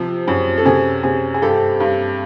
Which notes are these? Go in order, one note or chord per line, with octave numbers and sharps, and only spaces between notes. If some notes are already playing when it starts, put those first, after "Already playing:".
Already playing: C3 F3
F#2 G#4
A4
C3 G#4
C3 G#4
G#4
G2 G4 A4
G2